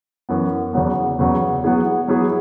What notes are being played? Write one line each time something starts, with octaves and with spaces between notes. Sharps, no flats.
F#2 E3 B3
E2 C#3 F#3 B3
E2 C#3 F#3 B3
F#3 B3 E4 G#4
F#3 B3 E4 G#4